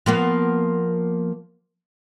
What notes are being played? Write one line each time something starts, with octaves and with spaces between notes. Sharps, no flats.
F3 A#3 B3